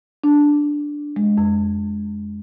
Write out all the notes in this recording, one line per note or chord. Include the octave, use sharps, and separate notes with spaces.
D4
G#3
F2